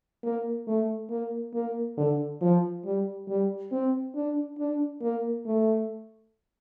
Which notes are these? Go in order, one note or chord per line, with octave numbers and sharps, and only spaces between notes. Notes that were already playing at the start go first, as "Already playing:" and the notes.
A#3
A3
A#3
A#3
D3
F3
G3
G3
C4
D4
D4
A#3
A3